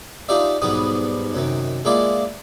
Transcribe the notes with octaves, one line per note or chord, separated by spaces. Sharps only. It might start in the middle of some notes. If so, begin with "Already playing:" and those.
D4 D#4 F4 G4 D5 E5
B1 G#2 G3 B3 D4 D#6
F#2 C3 D#3
G#3 A#3 D4 E4 F4 D5